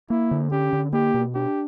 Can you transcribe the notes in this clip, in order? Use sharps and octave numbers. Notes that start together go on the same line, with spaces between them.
A#3 E4
D3
C#4 G4
D3
A#3 G4
B2
D4 G4